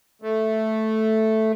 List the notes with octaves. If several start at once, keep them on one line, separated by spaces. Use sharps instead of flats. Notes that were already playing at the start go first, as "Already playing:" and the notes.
A3